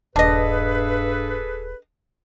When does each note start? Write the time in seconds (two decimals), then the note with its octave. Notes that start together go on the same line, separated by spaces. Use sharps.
0.16 D#1 G2 D4 G#4 A4 B4 D#5